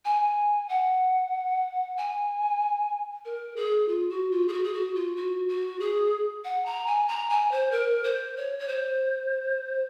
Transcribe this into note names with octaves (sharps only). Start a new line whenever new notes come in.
G#5
F#5
G#5
A#4
G#4
F4
F#4
F4
G#4
F#4
G#4
F#4
F4
F#4
F#4
G#4
F#5
A#5
G#5
A#5
G#5
C5
A#4
C5
C#5
C#5
C5